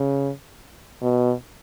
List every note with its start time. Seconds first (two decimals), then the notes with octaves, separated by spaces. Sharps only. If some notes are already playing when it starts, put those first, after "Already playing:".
Already playing: C#3
1.02 B2